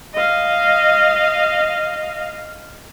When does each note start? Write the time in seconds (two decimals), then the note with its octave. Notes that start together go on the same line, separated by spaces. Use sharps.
0.14 D#5 F5